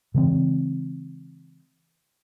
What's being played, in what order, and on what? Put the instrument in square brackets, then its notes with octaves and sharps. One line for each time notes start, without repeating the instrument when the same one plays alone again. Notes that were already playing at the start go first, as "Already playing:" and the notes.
[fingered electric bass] C#3 E3 G#3 C4